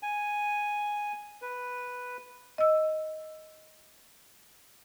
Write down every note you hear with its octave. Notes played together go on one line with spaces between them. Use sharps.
G#5
B4
D#5 E6